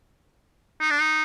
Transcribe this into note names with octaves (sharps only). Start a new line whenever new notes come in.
D#4
D4
D#4